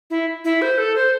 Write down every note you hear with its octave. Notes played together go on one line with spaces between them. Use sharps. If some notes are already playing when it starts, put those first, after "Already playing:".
E4
E4
C5
A4
C5